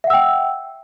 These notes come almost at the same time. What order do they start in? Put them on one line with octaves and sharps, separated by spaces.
E5 F#5 E6 G5